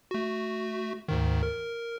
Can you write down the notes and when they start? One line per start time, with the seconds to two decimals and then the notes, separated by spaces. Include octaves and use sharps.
0.11 A3 F#4
1.08 D2 G#2 D#3
1.43 A#4